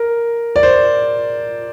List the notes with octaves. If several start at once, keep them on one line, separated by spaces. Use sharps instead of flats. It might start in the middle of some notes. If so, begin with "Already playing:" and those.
Already playing: A#4
D5
C5